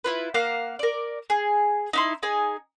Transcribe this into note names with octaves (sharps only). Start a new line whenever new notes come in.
E4 F4 B4
A#3 F5 F#5 F#6
A#4 D5
G#4
D#4 E4 C6
D#4 G#4 G#5